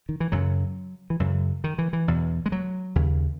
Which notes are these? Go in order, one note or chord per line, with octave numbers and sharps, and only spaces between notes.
D#3
E3
F#2 C#3 F#3
E3
F#2 C#3 F#3
D#3
E3
E3
E2 B2
G#3
F#3
D#2 C#3